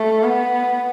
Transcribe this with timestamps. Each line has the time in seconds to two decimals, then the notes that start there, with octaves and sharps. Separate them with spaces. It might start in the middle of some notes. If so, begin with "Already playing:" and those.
Already playing: A3
0.23 B3